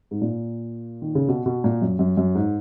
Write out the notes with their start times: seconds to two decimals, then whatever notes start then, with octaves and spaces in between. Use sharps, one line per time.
0.11 G#2
0.21 A#2
1.02 D#3
1.15 C#3
1.28 B2
1.46 B2
1.64 A#2
1.82 F#2
1.99 F#2
2.17 F#2
2.35 G#2